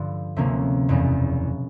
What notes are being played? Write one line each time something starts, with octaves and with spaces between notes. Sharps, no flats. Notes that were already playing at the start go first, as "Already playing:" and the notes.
Already playing: G2 D3 F3
D2 C3 F3 A#3 C#4
F#1 E2 B2